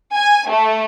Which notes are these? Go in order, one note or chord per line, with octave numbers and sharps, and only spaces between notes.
G#5
A3